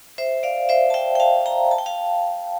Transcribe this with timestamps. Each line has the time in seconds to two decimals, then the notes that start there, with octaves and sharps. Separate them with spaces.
0.18 C5 E5
0.43 D5 F5
0.69 C5 E5
0.90 A5
0.94 E5 G5
1.15 G5
1.20 F5 A5
1.46 G5 A#5
1.71 A5
1.78 G5
1.86 F5 A5